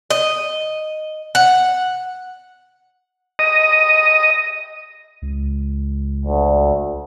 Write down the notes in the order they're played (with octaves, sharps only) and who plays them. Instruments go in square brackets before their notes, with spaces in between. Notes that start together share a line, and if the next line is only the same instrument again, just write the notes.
[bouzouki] D#5
F#5
[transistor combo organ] D#5
[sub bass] C#2
[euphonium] D2